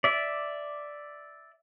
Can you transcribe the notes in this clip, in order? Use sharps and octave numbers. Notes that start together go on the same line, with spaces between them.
D5 E5